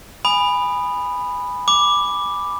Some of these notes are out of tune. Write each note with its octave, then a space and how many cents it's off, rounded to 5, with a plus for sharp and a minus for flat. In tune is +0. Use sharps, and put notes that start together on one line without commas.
G#5 -10 B5 +0 D#6 -20
B5 +0 D6 +0